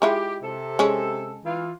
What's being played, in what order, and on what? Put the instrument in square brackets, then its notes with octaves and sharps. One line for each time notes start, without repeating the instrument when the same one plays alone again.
[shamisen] G#3 E4 F4 [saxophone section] G4
[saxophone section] C3 A4
[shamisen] G#3 C#4
[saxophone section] E3 F4